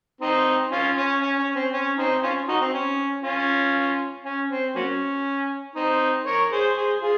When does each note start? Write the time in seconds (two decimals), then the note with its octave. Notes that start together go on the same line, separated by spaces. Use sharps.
0.21 C4 D#4
0.71 C#4 F4
0.97 C#4
1.22 C#4
1.39 C#4
1.56 C4
1.73 C#4
1.98 C4 D#4
2.23 C#4 F4
2.48 D#4 F#4
2.61 C4
2.74 C#4
3.23 C#4 F4
4.24 C#4
4.49 C4
4.75 F#3 A#3 C#4
5.76 C4 D#4
6.26 A#4 C#5
6.51 G#4 C5
6.76 G#4 C5
7.02 F4 G#4